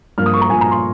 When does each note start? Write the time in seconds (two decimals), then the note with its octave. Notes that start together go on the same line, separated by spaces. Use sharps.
0.18 G2 F3 A#3 F6
0.26 D#6
0.34 C#6
0.41 A#5
0.50 G2 F3 A#3 G#5
0.61 A#5
0.71 C6